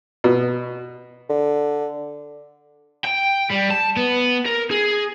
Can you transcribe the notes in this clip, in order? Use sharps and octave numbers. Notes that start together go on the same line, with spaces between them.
B2
D3
G5
G3
A5
B3
A#4
G#4